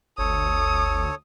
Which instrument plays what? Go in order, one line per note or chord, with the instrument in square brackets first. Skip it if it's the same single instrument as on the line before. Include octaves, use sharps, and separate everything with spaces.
[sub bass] G1 [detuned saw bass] D2 [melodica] A4 C#5 [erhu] D#6